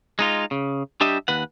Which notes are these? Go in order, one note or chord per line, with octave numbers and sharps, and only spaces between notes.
G#3 D#4 F4
C#3
G3 D4 G4 D#5 E5
D#2 B4 F#5